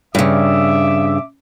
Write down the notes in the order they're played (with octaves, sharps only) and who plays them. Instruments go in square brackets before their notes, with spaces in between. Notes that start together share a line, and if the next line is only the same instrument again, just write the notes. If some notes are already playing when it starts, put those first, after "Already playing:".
[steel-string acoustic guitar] G2 C#3 [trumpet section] E5 D6